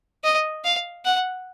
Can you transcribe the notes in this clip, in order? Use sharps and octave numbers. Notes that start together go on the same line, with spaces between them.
D#5
F5
F#5